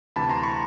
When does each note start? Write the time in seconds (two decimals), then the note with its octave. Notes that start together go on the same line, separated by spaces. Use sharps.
0.16 D2 C3 E3 A5 B5
0.30 A#5 C6
0.43 B5 C#6